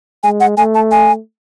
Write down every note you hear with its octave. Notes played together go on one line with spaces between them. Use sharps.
G#3 G#5
F#5
A3 G#5
A5
G#5